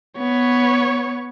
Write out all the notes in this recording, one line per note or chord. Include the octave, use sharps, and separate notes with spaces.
B3 C#5